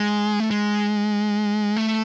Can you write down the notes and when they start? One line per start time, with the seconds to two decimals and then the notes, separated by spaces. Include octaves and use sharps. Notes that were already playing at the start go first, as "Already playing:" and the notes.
Already playing: G#3
0.40 A3
0.51 G#3
1.76 A3